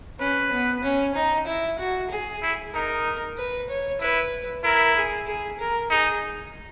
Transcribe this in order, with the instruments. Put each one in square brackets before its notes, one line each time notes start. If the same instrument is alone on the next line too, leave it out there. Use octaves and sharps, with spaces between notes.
[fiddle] C#4 [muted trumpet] B4
[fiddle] B3
C#4
D#4
E4
F#4
G#4
[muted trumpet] E4
[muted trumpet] D#4 [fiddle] A#4
[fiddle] B4
C#5
[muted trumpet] E4 [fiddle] B4
[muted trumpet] E4 [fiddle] A#4
[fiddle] G#4
G#4
A#4
[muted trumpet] D#4 [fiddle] G#4